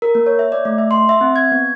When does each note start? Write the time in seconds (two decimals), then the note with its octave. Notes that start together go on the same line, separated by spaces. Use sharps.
0.02 A#4
0.15 A#3
0.26 C#5
0.39 E5
0.52 D5
0.65 A3
0.78 E5
0.91 C6
1.09 E5
1.21 C4
1.36 G#6
1.52 B3